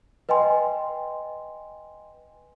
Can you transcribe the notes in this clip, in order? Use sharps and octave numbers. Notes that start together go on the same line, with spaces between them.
B4 D#5 G5 G#5 C6